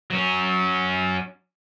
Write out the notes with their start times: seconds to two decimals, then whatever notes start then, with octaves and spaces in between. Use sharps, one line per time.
0.11 F#3 C#4